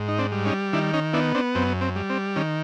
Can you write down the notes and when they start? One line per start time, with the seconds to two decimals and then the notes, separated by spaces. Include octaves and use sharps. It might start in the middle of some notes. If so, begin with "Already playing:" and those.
Already playing: G#2
0.08 D#4
0.19 C4 D4
0.32 G3
0.45 C#4 D#4
0.73 D#3 D4 E4
0.93 C#4 D#4
1.13 B3 D4 E4
1.34 C4 D4
1.55 F#2 C4
1.81 C4
1.96 G3
2.10 C4
2.36 D#3 C#4